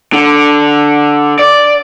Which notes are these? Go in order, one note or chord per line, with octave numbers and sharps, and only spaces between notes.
D3
D5